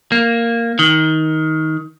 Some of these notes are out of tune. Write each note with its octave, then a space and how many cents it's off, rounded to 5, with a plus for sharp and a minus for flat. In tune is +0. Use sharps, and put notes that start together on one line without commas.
A#3 -5
D#3 +20